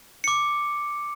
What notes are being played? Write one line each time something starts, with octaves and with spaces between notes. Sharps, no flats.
D6 C#7